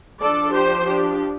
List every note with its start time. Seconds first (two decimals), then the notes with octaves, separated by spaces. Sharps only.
0.20 F3 D4 A4 D5
0.52 G4 C5
0.84 D4 G4